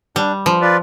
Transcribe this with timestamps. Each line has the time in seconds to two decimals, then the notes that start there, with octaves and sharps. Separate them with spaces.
0.16 G3 D4
0.46 F3
0.61 F4 B4 D5